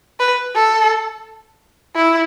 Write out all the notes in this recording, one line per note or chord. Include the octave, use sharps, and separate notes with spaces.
B4
A4
E4